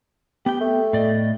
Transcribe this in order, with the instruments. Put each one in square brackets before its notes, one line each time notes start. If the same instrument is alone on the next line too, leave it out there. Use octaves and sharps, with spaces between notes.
[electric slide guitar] B3 G5 [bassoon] G4
[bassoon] A3
[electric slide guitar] A2 D5 D#5